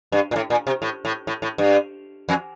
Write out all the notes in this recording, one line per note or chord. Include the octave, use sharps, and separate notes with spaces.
G2
A#2
A2
A#2
C3
A2
A2
A2
A2
G2
F2